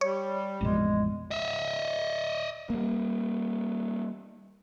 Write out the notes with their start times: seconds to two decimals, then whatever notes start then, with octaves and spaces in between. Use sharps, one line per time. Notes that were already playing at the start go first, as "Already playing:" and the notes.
0.01 G3 C#5
0.61 A1 F2 B2 G#3
1.31 D#5 E5
2.70 G3 A#3